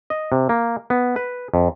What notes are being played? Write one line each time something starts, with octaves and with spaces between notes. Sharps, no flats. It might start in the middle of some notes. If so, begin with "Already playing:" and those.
D#5
C3
A#3
B3
B4
F2